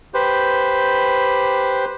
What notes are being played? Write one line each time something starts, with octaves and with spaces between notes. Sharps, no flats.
G4 B4 C5